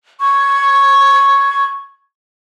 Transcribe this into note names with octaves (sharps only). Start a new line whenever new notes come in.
C#6 G#6